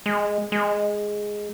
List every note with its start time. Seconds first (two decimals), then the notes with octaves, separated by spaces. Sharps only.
0.06 G#3
0.52 G#3